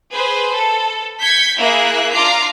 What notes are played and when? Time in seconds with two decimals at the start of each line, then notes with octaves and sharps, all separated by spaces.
0.13 G#4 B4 C5
0.53 A4
1.20 G6 G#6 B6 C#7
1.57 A#3 E4 G#4 E5 F#6
2.12 D4 F4 F5 A#5 D6 C7